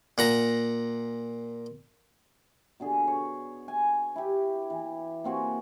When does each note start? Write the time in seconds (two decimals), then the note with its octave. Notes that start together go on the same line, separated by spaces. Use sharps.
0.18 A#2 F#5 A#5
2.80 B2 D3 G#4
3.07 C#5
3.68 G#5
4.16 E4 G4
4.70 E3
5.24 A#3 C4 F#4 G#4